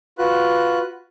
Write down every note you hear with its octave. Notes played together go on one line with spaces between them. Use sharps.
F4 F#4 B4 F#6